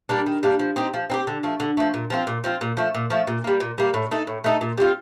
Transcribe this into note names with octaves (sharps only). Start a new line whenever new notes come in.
G3 A#3 D4
D#3
G3 A#3 D4
F3
C4 D#4 G4
F3
C4 D#4 G4
D3
F3 A3
D3
F3 A3
A#2
F3 C4 F4
A#2
F3 C4 F4
A#2
F3 A3
A#2
F3 A3
A#2
G3 A#3
A#2
G3 A#3
A2
A3 D#4 A4
A2
A3 D#4 A4
A#2
G3 C4 F4